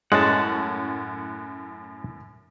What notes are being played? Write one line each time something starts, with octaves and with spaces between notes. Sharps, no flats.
F#2 A2 G#3 C#4 F#5 A5